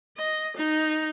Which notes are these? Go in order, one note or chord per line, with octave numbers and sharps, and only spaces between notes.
D#5
D#4